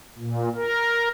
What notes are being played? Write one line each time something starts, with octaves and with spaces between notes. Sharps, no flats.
A#2
A#4